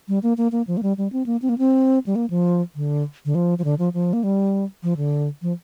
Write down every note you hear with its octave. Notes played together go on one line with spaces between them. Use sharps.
G3
A#3
A#3
A#3
F3
A#3
G3
G3
C4
A#3
C4
A#3
C4
G3
A#3
F3
D3
D3
F3
F3
D3
F3
F3
A#3
G3
F3
D3
F3